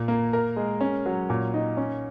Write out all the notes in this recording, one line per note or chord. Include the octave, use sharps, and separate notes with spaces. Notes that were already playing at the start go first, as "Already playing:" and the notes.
Already playing: A#2
A#3
A#4
G#3
C#4
F#3
A#2
D#4
C#4